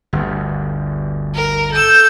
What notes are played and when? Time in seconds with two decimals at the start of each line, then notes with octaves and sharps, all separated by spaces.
0.13 G1 D2
1.35 A#4
1.72 A4 E6 G6